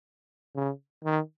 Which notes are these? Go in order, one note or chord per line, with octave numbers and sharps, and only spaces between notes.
C#3
D#3